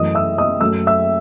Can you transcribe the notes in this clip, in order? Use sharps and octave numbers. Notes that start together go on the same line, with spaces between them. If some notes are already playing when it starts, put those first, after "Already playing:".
Already playing: F#2 E3 A3 D#5 D#6
E5 E6
D#5 D#6
F#2 F#3 A3 E6
E5 E6